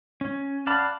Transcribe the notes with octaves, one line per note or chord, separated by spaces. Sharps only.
C#4
D5 F5 F#5 A5 B5